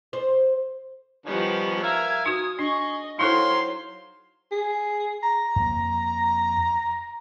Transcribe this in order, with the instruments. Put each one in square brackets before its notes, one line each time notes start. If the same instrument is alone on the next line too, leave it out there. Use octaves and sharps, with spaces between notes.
[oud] C5
[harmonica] D#3 B3 C#4 [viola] F3 G3
[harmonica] A#4 E5 F5 [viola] G#5
[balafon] D#4 F#4 [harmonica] D#6
[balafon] D4 [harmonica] G#4 C#6 [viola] D#5
[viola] F#3 C5 [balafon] D#4 E4 A4 [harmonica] F5 G5 [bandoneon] C6
[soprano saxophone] G#4
A#5
[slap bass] F2 A#3